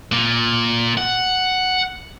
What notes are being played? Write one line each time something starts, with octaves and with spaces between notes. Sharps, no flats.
A#2
F#5